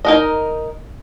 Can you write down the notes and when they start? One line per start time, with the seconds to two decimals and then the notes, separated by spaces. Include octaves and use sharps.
0.05 D#4 A#4 D#5